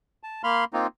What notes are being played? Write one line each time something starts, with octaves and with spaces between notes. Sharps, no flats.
A5
A#3 F5 B5 C6 F6
A#3 C4 D#4 F4